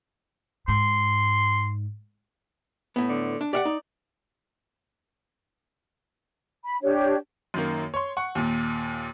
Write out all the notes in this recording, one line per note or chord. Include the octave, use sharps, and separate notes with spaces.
G#2 C6
A2 B3
D3
D4
G4 D5 F5 F#5
D#4
B5
D4 G4 C#5
F#2 D#3 A#3
C#5 C6
F#5 C#6
D#2 A#2